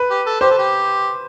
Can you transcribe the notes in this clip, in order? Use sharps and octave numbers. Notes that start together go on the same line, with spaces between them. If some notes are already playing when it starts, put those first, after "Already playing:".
Already playing: B4
G4
A4
G4 C5
A4
G4